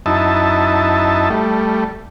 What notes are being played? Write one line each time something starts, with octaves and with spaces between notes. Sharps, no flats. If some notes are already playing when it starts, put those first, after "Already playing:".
F#2 D#4 E4 A5
G3 A3